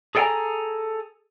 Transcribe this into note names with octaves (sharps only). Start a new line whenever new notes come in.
G#4 A4 D5 G5 G#5 A#5